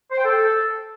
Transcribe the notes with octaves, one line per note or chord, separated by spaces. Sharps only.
C5
G5
A4